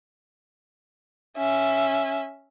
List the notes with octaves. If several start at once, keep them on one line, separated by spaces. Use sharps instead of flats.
C#4 E5